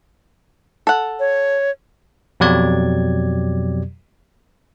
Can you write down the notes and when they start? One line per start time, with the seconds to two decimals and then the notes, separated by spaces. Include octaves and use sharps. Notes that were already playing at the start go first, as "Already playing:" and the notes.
0.87 A4 F#5
1.20 C#5
2.40 F2 B2 F#3 G4 D5 G#6